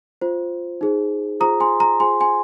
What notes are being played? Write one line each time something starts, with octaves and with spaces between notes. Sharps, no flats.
F4 C5
D#4 G#4 C5
F4 G#4 C5 A#5 D#6
G#5 C6
A#5
F4 G#4 C5 G#5 C6
G#5 C6